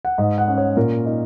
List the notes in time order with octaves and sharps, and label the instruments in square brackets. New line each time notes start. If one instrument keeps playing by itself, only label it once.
[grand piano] F#5
G#2 D#5
F#5
C#4
C#5
A#2 A#4
D#4